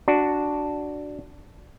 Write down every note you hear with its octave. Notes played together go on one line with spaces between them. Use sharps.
D4 F#4